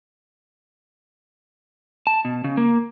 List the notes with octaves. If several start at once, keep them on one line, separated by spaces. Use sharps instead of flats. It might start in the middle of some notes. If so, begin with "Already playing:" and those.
A5
B2
C#3
A#3